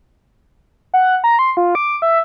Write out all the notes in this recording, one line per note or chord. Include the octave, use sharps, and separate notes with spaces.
F#5
A#5
C6
F4
D6
E5